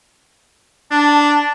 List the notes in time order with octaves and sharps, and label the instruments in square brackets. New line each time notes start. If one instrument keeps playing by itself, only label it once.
[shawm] D4 [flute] A5